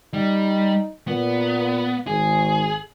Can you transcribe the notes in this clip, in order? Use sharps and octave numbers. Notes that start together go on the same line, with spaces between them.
G3 D#4
A#2 B3
G#1 G#4